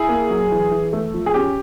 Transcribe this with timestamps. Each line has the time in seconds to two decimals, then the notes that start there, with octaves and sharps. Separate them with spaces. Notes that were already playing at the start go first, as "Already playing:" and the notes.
Already playing: E4 G#4
0.09 A#3
0.30 F#3
0.51 E3
0.71 E3
0.93 A3
1.14 F3
1.26 G#4
1.34 C#4 G4